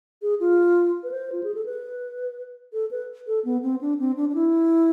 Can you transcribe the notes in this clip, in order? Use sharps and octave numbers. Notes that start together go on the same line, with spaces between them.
G#4
F4
B4
C5
F4
G#4
A4
B4
A4
B4
A4
B3
C4
D4
C4
D4
D4
E4